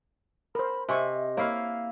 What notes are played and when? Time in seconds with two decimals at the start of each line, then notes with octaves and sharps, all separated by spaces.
0.55 A#4 C5 B5
0.89 C3 D#5 E5 G#5 C#6
1.37 A#3 E4 C#5 F5